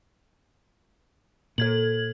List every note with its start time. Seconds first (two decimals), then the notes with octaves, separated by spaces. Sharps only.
1.58 A#2 A4 G#6 F#7